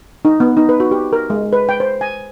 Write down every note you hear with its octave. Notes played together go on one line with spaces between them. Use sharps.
D#4
B3
D#4
B4
F#4
G4
A#4
G#3
B4
G5
C5
G#5